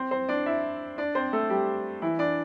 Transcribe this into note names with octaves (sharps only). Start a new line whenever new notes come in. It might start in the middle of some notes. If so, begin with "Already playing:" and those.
Already playing: C4 C5
C4 C5
D4 D5
E4 E5
D4 D5
C4 C5
A3 A4
G3 G4
E3 E4
D4 D5